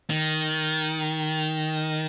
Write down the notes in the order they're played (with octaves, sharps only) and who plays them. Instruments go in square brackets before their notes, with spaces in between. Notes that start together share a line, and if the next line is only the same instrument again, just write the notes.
[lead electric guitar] D#3